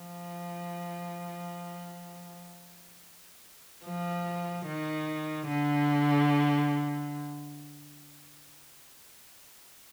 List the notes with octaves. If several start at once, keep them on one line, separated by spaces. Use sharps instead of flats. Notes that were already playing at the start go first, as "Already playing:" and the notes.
Already playing: F3
F3
D#3
D3